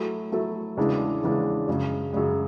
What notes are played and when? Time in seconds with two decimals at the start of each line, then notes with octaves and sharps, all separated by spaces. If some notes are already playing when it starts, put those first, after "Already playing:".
Already playing: F#3 A3 E4 A4
0.32 F#3 A3 E4 A4
0.77 E2 C#3 E3 G#3 D4
1.23 E2 C#3 E3 G#3 D4
1.68 F#2 C#3 G#3
2.13 F#2 C#3 G#3